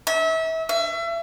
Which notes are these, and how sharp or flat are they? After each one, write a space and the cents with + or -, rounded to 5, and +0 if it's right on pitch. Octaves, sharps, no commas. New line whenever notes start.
E5 -30
E5 +35